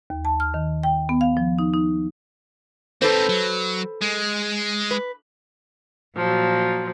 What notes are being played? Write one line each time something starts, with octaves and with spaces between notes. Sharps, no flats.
D#2
A5
F6
D#3
G5
B3
F5
F3
D#4
D#4
C4 D#4 A4 B4 C5
F#3
G#3
B4
A#2 F3 F#3